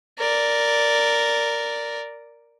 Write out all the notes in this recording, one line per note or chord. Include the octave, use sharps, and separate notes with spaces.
A#4 D5